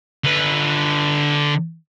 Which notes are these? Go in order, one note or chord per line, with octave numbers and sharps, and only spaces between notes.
D3 B4